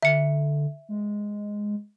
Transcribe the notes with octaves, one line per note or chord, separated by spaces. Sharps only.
D3 E5 C#7
G#3